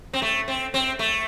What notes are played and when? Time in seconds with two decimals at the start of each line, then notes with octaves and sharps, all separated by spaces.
0.13 C4
0.22 A3
0.48 C4
0.74 C4
0.99 A3